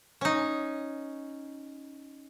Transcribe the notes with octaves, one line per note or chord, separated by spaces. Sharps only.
C#4 D#4